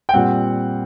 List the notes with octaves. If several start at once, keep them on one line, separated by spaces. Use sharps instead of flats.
G5
A#2 G3 C4 F#5